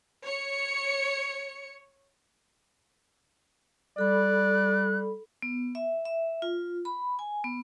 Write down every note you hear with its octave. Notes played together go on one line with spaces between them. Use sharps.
C#5 C#7
G3 A4 D5 B5 F#6
B3
E5
E5
F4
B5
G#5
B3